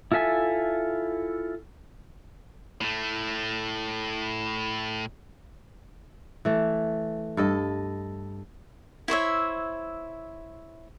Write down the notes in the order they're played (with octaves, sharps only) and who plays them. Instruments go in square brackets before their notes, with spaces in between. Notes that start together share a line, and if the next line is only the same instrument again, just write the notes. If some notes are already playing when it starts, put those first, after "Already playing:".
[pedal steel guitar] E4 F4 A4 E5 G#5
[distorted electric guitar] A2 A3
[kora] E3 A3
G2 A4 D#5
[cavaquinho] E4 C5 C#5 E5